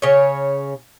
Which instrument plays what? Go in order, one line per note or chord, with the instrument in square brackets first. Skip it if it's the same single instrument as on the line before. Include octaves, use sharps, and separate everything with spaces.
[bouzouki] C#3 C#5